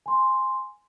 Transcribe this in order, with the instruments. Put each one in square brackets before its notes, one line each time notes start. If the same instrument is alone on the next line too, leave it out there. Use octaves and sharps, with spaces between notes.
[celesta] G#5 C6